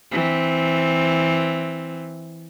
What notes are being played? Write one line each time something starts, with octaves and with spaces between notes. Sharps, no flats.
E3 C4